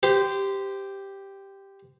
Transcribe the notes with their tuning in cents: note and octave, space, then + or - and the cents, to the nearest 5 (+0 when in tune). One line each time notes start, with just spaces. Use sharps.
G4 +0 C5 -25